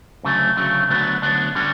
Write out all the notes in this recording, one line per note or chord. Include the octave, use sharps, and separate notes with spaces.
D2 C#3 F#3 A3
D2 C#3 F#3 A3
D2 D3 F#3 B3 D4
D2 D3 F#3 B3 D4
D3 G3 C#4 F#4